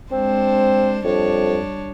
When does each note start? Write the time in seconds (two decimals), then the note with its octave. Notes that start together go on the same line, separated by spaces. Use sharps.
0.12 G#3 C4 D4 C5
1.05 F2 G3 D4 C#5